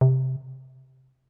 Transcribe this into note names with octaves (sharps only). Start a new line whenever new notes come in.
C3